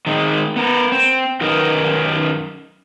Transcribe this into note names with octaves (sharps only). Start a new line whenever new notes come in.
D#3 G#3 C4
B3 A#4
C4
F#2 D#3 D#4 A#4 B4